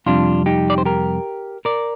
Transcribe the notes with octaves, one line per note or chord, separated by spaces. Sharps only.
F2 C3 G3 D4 F4
D#4 G4
D5
C5
G4 A#4
A#4 D5